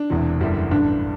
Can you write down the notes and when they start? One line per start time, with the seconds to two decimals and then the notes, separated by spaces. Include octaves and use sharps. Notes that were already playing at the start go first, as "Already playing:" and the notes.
Already playing: D4
0.10 E1 E2 C3 E3
0.40 F#1 E2 D3 G3 E4
0.71 A1 G2 D3 D4